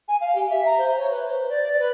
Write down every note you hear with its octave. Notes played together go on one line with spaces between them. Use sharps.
G#5
F5
G4
E5
A#5
C5
C#5
B4
C5
D5
D5
B4